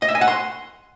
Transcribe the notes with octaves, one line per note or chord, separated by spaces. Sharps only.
D#5
E5
G#5
F#5
C6